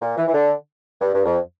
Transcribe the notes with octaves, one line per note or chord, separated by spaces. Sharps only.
A#2
E3
E3
D3
G2
G2
F2